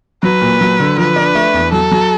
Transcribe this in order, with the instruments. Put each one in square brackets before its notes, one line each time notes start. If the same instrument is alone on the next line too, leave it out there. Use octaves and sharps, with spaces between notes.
[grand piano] F#3 [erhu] B4
[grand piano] A#2
F#3
D3
[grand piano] F3 [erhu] B4
[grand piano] D4
A3
E2
[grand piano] F#3 [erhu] A4
[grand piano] F#3